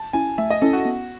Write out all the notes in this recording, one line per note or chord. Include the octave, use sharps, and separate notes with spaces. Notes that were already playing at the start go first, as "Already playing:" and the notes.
Already playing: A5
C#4 E4 G#5
A3 E5
D#5
C#4 E4 A4
F#4
B3